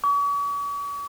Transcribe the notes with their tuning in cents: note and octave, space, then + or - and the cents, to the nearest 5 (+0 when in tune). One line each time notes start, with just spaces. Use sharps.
C#6 +45